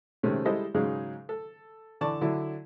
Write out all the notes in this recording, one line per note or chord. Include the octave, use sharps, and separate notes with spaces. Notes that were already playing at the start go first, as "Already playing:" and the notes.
C3 D#3 G#3 A3 C4 C#4
G3 G#3 E4 A4 C5 D#5
G#2 C#3 F#3 G#3 D#4 G#4
A4
D3 E3 D5 A5 C#6
D3 F#3 D4 E4